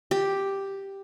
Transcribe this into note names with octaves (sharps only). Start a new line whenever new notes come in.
G4